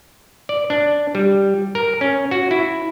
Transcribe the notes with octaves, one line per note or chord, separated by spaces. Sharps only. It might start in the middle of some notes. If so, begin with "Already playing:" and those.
D5
D4
G3
A#4
C#4
F#4
E4